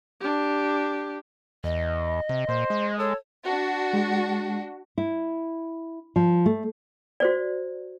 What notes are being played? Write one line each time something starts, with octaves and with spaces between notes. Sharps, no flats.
D4 G4
E2 D#5
C3
A#2 C5
G#3
A4 C#5
D4 F#4
G#3
E4
F3
A3
F#4 C5 D5